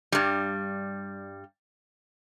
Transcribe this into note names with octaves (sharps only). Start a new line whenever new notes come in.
G2 G3